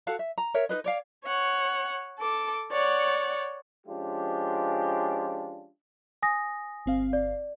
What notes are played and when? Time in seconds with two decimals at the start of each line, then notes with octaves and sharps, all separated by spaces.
0.07 F#4 A4 F5 F#5
0.19 E5
0.38 A#5
0.54 A#4 C#5 E5
0.69 D#4 G#4 B4 D#5
0.84 C#5 D5 F5
1.25 C#5 F#5
2.19 A4 D6
2.71 C#5 D5 F#5
3.87 F3 G#3 C#4 D4 F4 G4
6.22 G#5 D#6 A#6
6.86 G1 C4 F5
7.13 D5